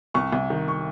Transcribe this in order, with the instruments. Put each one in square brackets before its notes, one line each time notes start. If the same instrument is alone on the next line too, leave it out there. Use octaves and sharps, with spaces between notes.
[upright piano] C2 C#6
C2
D#3
C#6